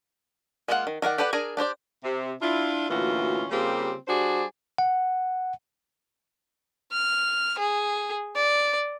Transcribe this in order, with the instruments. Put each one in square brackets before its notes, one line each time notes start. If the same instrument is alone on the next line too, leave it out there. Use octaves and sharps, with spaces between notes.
[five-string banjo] G#3 A#3 F4 F#4 F#5
D#3
D#3 A#4 D5 F#5
G4 A4 B4 D5 F#5
D4 G#4 A#4 G#5 A#5
D4 G4 C5 D5
[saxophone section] C3
D4 E4 F4
D2 A#2 E3 C#4 F4 F#4
C#3 G3 A#3 C4 F4 G4
G3 D4 F#4 G#4 C5 D5
[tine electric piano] F#5
[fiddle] F6
G#4
D5